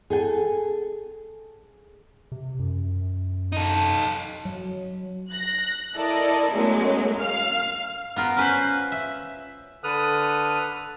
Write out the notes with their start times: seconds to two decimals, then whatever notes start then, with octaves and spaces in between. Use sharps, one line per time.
0.10 G#4 A4 G5 G#5
2.32 C3
2.59 F#2
3.52 D#4 A4
4.45 F#3
5.29 F#6 A#6
5.95 E4 A4 A#4 D5 D#5
6.52 F#2 F#3 G#3 A3 B3
7.17 F5 F6
8.16 B3 F4 A#4
8.37 C#4 B4 C5
8.92 E5
9.84 D3 A4 B4 D#6 F6 F#6